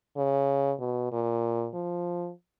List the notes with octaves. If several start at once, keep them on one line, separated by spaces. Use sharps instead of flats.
C#3
B2
A#2
F3